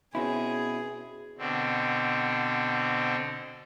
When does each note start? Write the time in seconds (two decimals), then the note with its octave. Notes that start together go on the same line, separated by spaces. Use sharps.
0.15 B2 C4 C#4 E4 G#4
1.38 B2 D3 C4